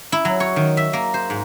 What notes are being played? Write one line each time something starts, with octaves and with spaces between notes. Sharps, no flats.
E4
F#3
C#5
D#3
E5
A#3
C5
G#2